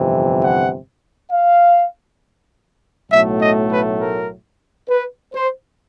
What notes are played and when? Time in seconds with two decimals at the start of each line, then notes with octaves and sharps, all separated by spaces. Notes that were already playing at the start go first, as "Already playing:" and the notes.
Already playing: G1 F2 C3 E3
0.43 F#5
1.32 F5
3.10 B1 A2 F#3 A3 E5
3.41 D#5
3.71 B4
4.01 A#4
4.89 B4
5.34 C5